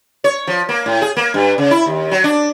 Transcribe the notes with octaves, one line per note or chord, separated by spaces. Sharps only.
C#5
F3
A#3
A2
G#4
A#3
G2
C#3
E4
D#2
F#3
D4